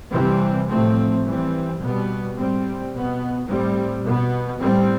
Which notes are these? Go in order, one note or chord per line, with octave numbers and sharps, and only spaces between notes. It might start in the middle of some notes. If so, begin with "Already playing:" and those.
C3 E3 G3 C4
A2 F3 A3 C4
E3 G3 C4
B2 G3 B3
A2 G3 C4
B2 B3
A2 G3 C4
B2 B3
A2 G3 C4